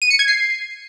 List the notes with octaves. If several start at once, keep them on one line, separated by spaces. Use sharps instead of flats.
D#7
C#7
G#6
C7